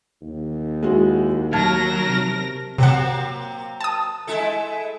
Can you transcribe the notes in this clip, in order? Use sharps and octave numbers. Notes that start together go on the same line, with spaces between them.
D#2
G#3 E4 F#4
F#3 A#4 A5 F6 G#6 A#6
C3
C3 F#3 A#3 C4 F#5
A5 D#6
G#3 E4 A4